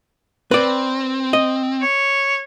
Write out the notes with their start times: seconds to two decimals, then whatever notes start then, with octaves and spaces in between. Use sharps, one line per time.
0.51 C4 B4 D5
1.33 D#5
1.82 C#5